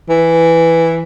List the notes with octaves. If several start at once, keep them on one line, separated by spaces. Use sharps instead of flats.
E3